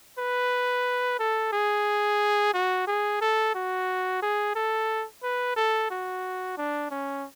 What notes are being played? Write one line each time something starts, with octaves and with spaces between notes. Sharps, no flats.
B4
A4
G#4
F#4
G#4
A4
F#4
G#4
A4
B4
A4
F#4
D4
C#4